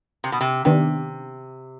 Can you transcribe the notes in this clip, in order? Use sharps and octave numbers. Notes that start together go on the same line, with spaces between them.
C3
B2
C3
C3 D#3 B3 D4 G4